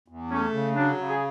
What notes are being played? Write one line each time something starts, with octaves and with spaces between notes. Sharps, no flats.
E2
A3 C#4
C#3
F#3 D4
C#3
G#4